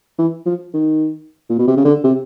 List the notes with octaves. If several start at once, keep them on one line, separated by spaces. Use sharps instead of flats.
E3
F3
D#3
A#2
B2
C3
C#3
D3
C3